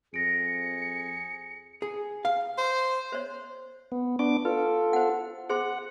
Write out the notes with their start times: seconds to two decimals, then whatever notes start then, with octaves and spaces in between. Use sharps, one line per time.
0.14 F2 G#4 A#6 C#7 D7
1.82 G#4
2.25 F5
2.58 C5
3.12 C5 C#5
3.92 B3
4.19 B3 D4 C#6 D6
4.45 F4 A4 B4
4.93 C5 F#5
5.50 G#4 C5 F#5 C6